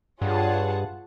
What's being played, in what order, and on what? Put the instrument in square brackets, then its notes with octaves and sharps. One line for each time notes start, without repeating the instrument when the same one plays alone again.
[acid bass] G2 [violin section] F4 G#4 C#5 F#5 A5